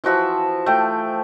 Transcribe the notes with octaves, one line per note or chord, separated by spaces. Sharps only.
E3 F3 F#4 E5
A3 G5